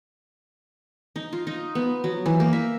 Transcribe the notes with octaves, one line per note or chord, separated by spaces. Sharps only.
D#4
F4
D#4
B3
F#3
E3
A#3
E5